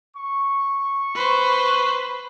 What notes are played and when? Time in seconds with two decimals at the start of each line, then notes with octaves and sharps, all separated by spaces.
0.16 C#6
1.15 B4 C5